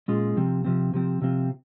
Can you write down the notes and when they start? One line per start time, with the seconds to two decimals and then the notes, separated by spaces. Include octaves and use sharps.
0.08 A#2 G#3 C#4 F4 G#4
0.36 C3 F3 C4
0.64 C3 F3 C4
0.94 C3 F3 C4
1.22 C3 F3 C4